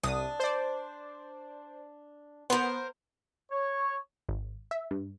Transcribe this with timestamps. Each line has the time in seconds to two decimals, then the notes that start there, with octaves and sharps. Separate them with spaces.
0.03 C2 D4 D#6
0.40 C5 D5
2.50 B3 A#4 C5
3.52 C#5
4.29 G#1
4.71 E5
4.91 G2